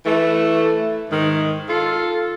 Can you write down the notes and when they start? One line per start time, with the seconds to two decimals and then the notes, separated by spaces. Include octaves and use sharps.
0.04 E3 A3
1.09 G#2 D#3
1.67 F4 A4